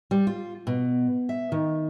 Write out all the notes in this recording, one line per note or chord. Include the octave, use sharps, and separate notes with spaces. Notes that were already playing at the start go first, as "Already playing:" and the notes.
G3
F4
B2
E5
D#3